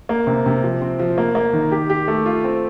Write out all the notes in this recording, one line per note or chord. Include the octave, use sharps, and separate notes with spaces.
A#3
C3
C3
F3
C4
F3
A#3
A#3
D#3
G4
G4
A3
F4
C4